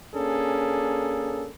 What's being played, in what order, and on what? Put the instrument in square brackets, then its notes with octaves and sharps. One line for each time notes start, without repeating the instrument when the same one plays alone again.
[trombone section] A#3 C#4 D4 G#4 A4